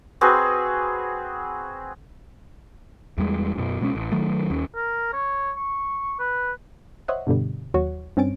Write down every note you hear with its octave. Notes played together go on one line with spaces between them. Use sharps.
C4 F#4 G#4 B4
E2 G3 G#3
F#2 B2
B2 G#3 B3 C#4
A1
D#3 F#3 A3
D#2 C#4
A#4
C#5
C#6
B4
C5 C#5 D#5 E5 F#5
G2 B2 D3 G3
D#2 F#3 F#4 C#5
G2 C4 C#4 A6 D7